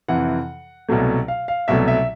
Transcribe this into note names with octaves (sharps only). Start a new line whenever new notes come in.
F2 C3 E3 F#5
C2 B2 F#3 A3
F5
F5
C2 B2 F#3 A3 E5
E5